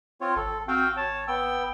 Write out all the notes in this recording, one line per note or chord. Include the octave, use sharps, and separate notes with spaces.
C4 F4 C#5
G#1 A4
C4 F#4 F5 G5
C#5 A5
B3 G5 E6